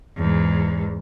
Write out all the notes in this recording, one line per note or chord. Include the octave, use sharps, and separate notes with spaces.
E2 G#2